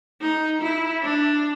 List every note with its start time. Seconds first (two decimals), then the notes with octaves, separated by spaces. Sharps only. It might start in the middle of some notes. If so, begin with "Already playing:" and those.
0.21 D#4
0.61 E4
1.02 D4